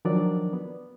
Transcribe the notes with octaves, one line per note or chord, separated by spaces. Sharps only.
D#3 F3 F#3 D4 A#4 D5
B3